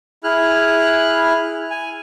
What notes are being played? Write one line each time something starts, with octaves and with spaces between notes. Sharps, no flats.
E4 G#4 F6 F#6
G#5